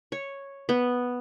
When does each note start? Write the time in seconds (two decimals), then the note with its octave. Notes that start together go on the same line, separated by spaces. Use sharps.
0.12 C#5
0.69 B3